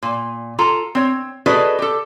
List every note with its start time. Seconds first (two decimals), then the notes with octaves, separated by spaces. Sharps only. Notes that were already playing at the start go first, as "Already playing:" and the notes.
0.03 A#2
0.59 F4 A4 A#5
0.95 C4 C#5
1.46 F#4 G#4 A4 B4 D5 D#5
1.79 G4 A4